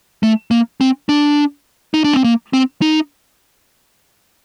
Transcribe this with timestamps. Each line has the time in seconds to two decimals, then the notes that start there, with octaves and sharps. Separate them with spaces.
0.23 A3
0.51 A#3
0.81 C4
1.09 D4
1.94 D#4
2.04 D4
2.13 C4
2.24 A#3
2.53 C4
2.82 D#4